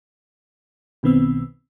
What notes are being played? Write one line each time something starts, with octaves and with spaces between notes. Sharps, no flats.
B1 B2 D#3 B3 C4 E6